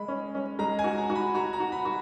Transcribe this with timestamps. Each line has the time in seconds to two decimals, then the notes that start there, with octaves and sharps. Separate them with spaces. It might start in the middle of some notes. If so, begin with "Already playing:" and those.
Already playing: G#3 B5
0.08 C#4
0.35 C#4
0.59 G#3 A#5
0.79 G#5
0.84 F#4
0.98 A#5
1.10 F#4
1.15 B5
1.35 F#4 A#5
1.53 A#5
1.60 F#4
1.72 B5
1.85 F#4